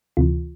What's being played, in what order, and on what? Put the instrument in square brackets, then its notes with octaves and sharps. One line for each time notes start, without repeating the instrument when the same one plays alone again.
[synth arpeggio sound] D2 C3 E3 F4